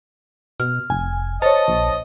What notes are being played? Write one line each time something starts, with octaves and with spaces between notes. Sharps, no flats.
B2 F6
F1 G#5
C5 C#5 D#5 A5
A#1